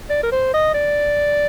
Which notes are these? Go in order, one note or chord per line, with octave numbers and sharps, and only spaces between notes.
D5
A#4
C5
D#5
D5